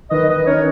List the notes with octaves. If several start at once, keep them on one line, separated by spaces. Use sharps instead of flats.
D#3 B4 D#5
D#3 B4 D#5
C#4 A#4 C#5